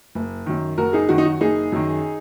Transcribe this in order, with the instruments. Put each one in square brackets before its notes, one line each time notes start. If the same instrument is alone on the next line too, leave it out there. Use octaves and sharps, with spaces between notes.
[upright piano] F#1
F#2 D#3
F#1 F#4 A#4
D#4 G#4
F#2 D#3 F#4
D#4
F#4
F#1 D#4 G#4
F#2 D#3